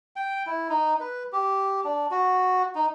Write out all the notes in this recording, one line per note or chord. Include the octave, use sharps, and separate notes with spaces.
G5
E4
D#4
B4
G4
D4
F#4
D#4